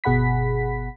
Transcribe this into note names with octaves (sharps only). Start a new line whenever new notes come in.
G1 B2 G#4 F#5 B5 B6